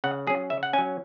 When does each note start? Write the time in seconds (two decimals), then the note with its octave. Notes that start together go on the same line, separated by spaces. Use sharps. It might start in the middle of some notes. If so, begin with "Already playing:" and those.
0.04 C#3 F#5
0.27 F#3 G#4
0.30 C#4
0.50 C#3 E5
0.63 F#5
0.73 C#4 G#5
0.78 F#3